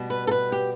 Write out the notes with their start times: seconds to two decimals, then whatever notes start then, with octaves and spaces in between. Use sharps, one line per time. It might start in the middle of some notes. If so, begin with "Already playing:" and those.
Already playing: B2 G3
0.10 B4
0.27 A4
0.31 B4
0.52 G4